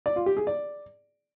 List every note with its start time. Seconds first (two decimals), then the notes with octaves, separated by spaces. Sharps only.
0.06 D5
0.16 F4
0.26 G4
0.37 G#4
0.47 D5